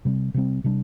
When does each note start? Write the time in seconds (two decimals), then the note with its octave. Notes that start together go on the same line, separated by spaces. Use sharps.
0.05 C3 G3 C4
0.34 C3 G3 C4
0.64 C3 G3 D4